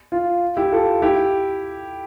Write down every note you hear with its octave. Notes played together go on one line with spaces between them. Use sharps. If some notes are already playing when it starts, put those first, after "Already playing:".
F4
E4 G4
F4 A4
E4 G4